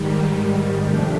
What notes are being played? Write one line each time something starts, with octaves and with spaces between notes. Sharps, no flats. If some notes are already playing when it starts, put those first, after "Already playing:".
Already playing: G#2 D#3 G3
C3 F3 A3 D4 G4